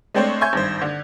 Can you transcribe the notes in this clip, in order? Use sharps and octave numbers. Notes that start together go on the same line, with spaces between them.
G#3 A3 C4 D4 C5 C#5
E5 G#5 C6 C#6 G6 G#6
G#1 G2 C5
D3